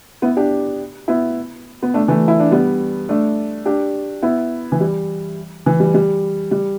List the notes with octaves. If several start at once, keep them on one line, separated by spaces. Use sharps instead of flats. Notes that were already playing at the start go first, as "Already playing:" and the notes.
B3 E4
D4 G4
B3 E4
B3
A3 D4
E3 A3
E4
D4
G3 B3
A3 D4
D4 G4
B3 E4
E3
G3
E3
G3
G3
G3